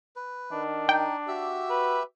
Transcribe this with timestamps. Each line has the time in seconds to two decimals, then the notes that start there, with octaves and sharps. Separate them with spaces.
0.16 B4
0.52 D#3 D4
0.89 D#4 G5
1.28 F#4 G4 E5 E6
1.70 B4